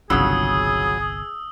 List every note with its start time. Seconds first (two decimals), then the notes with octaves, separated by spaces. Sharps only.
0.10 G1 C2 F2 C#3 F#3 G#4 D#6 E6